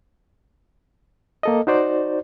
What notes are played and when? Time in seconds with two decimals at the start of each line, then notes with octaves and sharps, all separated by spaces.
1.43 A#3 A4 D#5
1.67 D#4 F#4 C5 D5